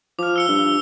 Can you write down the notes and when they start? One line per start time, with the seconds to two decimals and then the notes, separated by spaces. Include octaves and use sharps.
0.19 F3 D6 F6
0.36 E6 C#7 G7
0.48 G2